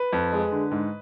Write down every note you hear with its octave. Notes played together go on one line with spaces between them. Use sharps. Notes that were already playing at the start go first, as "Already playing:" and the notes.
Already playing: B4
F2
G#3
D3
G#2